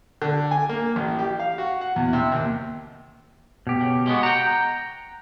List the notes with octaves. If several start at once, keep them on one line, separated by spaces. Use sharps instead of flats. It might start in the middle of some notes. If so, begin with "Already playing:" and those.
D3
G#5
A#3
A1
G4
F5
F#4
F#5
E2
C3
D#2
B2 G4
C#3
G#3 B3 F#4
F#5 G5 A#5